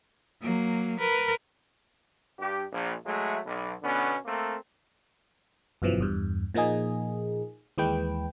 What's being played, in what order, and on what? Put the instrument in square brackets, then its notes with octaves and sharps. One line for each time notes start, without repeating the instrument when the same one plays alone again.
[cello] F#3 A#3
A#4 B4
[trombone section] G2 G4
A#1
F#3 G#3 A3
B1
B2 D3 B3 C#4
A3 A#3 C4 A#4
[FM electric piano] G1 F#2 B2 E3 F3
E2 G2
A#2 F3 A#3 D#4 G#4
D#2 E3 G#3 B4 G5